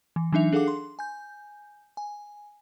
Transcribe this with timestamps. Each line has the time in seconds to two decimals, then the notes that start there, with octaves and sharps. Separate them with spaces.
0.16 E3
0.33 E3 F#3 D4 D#4 E5 F7
0.52 D4 G#4 A4 F5 F#5 D6
0.68 C6
0.99 G#5 G6
1.97 G#5